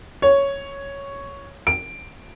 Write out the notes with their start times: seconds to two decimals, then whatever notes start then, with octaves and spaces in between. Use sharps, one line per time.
0.22 C#5
1.67 D7